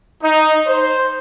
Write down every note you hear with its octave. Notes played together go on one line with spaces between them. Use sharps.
D#4
C5